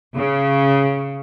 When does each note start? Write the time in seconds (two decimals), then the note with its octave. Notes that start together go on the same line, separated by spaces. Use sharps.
0.16 C#3